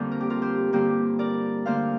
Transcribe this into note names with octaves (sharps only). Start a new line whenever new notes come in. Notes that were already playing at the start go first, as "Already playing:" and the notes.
Already playing: F2 D3 G3 A#3 C5
A#4
G4
F4 A#4
G4 C5
G2 D3 G3 A#3 G4 C5
A#4 D5
D2 D3 A#3 C5 F5